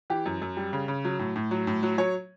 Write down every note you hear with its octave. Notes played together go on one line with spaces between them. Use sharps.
E3 G4
F#2
F#2
G3
C#3
C#3
F#3
A2
A2
F#3
A2
F#3
F#3 C#5